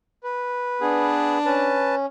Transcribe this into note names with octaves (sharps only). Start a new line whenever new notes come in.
B4
B3 D4 G#4
C#4 B4 A5